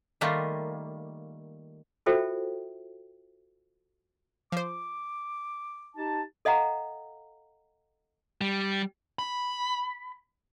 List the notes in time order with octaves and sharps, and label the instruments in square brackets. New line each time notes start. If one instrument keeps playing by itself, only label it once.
[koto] D#3 G3 A3 A#3 F4
[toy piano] F4 F#4 A4 C5 E5 G5
[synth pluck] F3 C5 [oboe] D6
[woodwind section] D#4 G4 A5
[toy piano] A4 D#5 F5 F#5 A#5
[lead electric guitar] G3
B5